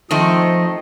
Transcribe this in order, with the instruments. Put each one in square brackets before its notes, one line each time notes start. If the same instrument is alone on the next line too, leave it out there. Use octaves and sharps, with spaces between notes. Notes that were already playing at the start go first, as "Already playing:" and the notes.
[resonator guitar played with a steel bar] D#3 A3 C4 [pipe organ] F3 D#5